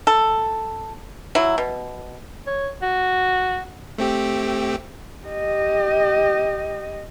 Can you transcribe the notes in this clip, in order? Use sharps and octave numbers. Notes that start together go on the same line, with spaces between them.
A4
F#3 E4
B2
C#5
F#4
A3 C4 G4
G4 D#5